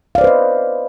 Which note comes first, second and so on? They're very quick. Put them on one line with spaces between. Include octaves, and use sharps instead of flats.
F5 D5 C5 B4 D#5